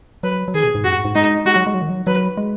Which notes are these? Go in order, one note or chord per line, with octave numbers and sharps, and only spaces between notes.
F#3 B4
F#3
D#3 G#4
B2
G#2
F#2 F#4
G#2
G#2
G#3 D#4
G#3 F#4
F#3
G#3
F#3
D#3
F#3
F#3 B4
G#3